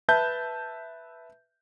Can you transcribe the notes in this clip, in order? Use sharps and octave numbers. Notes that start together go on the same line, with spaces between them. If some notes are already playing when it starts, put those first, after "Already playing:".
B4 E5 A5 G6